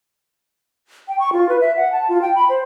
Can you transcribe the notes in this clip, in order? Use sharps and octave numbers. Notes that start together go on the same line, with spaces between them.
G5
C#6
F4
B4
E5
F#5
A5
F4
G5
B5
C5